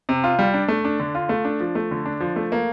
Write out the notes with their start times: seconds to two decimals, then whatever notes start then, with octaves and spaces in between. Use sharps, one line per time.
0.09 C3
0.24 F4
0.39 G3
0.54 D4
0.68 A3
0.85 D4
1.00 D3
1.15 F4
1.29 A3
1.45 D4
1.60 F3
1.75 A3
1.91 D3
2.06 D4
2.20 F3
2.36 A3
2.52 A#3